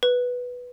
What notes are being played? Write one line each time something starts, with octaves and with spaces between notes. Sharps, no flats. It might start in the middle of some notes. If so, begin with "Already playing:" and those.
B4